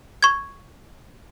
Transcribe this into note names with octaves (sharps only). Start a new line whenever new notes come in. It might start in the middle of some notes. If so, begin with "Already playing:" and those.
C#6 G#6